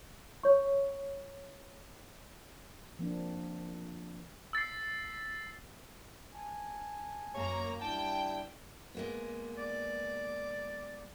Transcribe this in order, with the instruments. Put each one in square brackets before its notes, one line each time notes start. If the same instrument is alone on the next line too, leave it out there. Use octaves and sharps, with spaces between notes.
[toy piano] C#5 C#6
[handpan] F3 A#3 C4 D4
[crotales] E6 A6 B6 C7
[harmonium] G#5 A5
[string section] F#2 A#3 A#5 [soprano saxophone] C#5
[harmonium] G3 D4 E4 [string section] G5 [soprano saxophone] A5
[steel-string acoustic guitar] G#3 A#3 B3
[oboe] D5